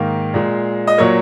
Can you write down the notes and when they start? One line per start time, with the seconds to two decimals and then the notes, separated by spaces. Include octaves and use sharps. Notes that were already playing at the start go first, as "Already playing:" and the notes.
Already playing: G#2 D#3 A#3 F5
0.34 A#2 G#3
0.87 D#5
0.98 A#2 F#3 A#3 C#5